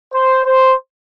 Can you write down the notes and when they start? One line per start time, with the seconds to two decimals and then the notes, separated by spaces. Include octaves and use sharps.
0.13 C5
0.45 C5